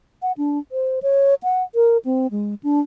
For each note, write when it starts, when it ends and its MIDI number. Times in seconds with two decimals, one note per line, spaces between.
0.22 0.32 78
0.38 0.59 62
0.72 1.00 72
1.03 1.35 73
1.43 1.63 78
1.75 1.97 70
2.05 2.27 60
2.31 2.55 56
2.63 2.80 62